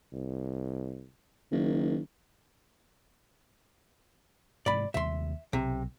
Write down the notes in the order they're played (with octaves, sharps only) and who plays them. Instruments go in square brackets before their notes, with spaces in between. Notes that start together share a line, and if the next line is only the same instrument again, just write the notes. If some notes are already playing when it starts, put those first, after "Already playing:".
[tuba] C2
[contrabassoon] F#1 [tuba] D#3
[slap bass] G#2 C3 E3 [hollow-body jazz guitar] D5 B5
[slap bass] D#2 C3 G3 [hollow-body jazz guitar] E5 C6
[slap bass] B1 [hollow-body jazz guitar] C3